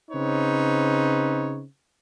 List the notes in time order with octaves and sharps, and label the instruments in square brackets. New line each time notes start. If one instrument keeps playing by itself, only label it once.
[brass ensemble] C#3 C4 D#4 B4 C#5